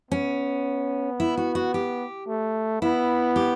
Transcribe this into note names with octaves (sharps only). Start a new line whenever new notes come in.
B3 C#4
E4
F#4
F#4
G4
A3
B3 E4
G4